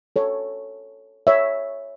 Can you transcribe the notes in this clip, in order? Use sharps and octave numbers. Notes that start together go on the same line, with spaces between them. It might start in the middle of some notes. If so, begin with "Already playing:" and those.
A4 C#5
C#5 E5